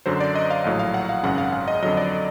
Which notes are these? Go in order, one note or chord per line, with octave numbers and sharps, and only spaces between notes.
F#2 D3 F#3 C5
D5
D#5
F5
A#1 A2 F#3 F5
F5
F#5
F5
G#1 F#2 C#3 F#5
F5
F5
D#5
F2 D3 F#3 D#5
D5